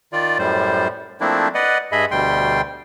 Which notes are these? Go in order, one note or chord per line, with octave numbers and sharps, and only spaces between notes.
D#3 F4 D5
F#2 A2 G3 C5
F3 A3 A#3 C4 D4 E4
B4 D5 D#5 F#5
G2 G#4 D#5 E5 B5
D2 B2 G3 G5 C6